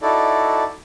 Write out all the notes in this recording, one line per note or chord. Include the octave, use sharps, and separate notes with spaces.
D#4 E4 F#4 A4 D5